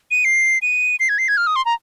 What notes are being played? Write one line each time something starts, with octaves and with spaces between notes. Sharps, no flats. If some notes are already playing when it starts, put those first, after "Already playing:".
D#7
C7
D#7
C7
G#6
C7
G#6
F6
D#6
C6
A#5